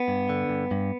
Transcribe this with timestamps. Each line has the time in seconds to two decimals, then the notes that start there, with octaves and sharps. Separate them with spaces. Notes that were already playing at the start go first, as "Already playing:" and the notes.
Already playing: B3
0.08 G2
0.29 D3
0.49 G2
0.71 G2